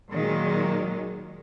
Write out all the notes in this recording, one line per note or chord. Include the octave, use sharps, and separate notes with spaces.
A#2 D#3 F#3 G#3